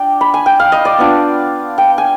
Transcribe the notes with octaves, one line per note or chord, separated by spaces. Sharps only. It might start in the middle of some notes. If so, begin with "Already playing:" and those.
Already playing: D4 F4 D5 G5
B5
G#5
G5
F5
D#5
D5
B3 D4 F4
G5
G#5